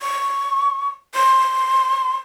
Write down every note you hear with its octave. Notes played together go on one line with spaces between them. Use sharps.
C#6
C6